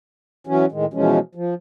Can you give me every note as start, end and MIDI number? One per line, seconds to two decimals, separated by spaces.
0.47 0.66 52
0.47 0.66 54
0.47 0.66 61
0.72 0.86 45
0.72 0.86 51
0.72 0.86 56
0.94 1.19 47
0.94 1.19 52
0.94 1.19 53
0.94 1.19 56
0.94 1.19 61
1.35 1.54 53